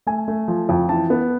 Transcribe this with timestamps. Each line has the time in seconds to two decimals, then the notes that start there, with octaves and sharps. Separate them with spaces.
0.07 A3 G#5
0.28 A3
0.48 F3
0.69 F2
0.89 E3 A5
1.10 B3